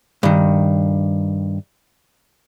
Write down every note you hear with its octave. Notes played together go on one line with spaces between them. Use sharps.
G2 D#3